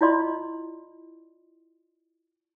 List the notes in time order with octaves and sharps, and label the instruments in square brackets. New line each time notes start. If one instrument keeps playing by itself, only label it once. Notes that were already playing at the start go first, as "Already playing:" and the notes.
[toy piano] E4 F4 D5 D#5 C6